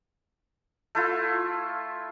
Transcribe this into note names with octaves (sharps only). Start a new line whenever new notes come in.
A3 E4 F4